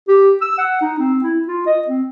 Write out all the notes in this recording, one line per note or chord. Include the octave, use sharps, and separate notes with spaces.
G4
E6
F#5
D#4
C4
E4
F4
D#5
C4